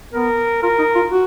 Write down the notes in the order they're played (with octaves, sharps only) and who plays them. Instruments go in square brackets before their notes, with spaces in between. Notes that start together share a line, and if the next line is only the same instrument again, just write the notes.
[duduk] B3 [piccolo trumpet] A#4
[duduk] F4 [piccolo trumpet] A#4
[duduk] D#4
F4
F#4